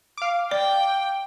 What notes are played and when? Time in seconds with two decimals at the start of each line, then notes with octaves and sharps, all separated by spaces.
0.17 F5 D6
0.51 D5 G5